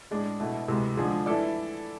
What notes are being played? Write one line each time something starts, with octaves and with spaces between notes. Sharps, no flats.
A2 G#3 D4 G#4
B2 A3 E4
D2 C3 E3 G#3
D3 F3 G#3 D4 G#4
E3 A3 E4 A4 D5